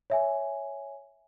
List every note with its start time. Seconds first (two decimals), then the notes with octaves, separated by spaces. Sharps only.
0.10 C#5 E5 G#5